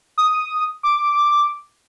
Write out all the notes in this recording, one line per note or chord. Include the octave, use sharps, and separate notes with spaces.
D#6
D6